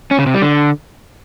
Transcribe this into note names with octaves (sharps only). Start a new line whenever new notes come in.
C#4
C#3
C3
G3
D3